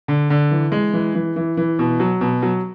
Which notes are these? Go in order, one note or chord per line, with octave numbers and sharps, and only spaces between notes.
D3
D3
E3
G#3
E3
E3
E3
E3
B2
F#3
B2
F#3